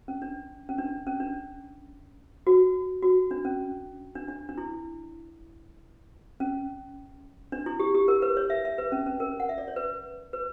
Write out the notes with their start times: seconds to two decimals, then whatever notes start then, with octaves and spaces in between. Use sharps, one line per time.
0.08 C#4
0.22 D4
0.69 C#4
0.78 D4
1.07 C#4
1.20 D4
2.47 F#4
3.03 F#4
3.31 D4
3.45 C#4
4.15 D4
4.29 D4
4.49 D4
4.58 E4
6.40 C#4
7.52 D4
7.66 E4
7.80 G4
7.95 G4
8.08 A#4
8.22 B4
8.37 C#5
8.50 E5
8.65 E5
8.78 B4
8.92 C#4
9.06 C#4
9.20 A#4
9.40 F#5
9.49 E5
9.58 D5
9.68 C#5
9.76 B4
10.33 B4